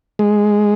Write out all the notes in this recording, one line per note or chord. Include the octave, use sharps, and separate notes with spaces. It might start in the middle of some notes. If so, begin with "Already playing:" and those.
G#3